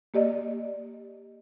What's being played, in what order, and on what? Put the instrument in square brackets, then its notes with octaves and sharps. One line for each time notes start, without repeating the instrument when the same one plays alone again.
[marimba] A#3 G4 D5 D#5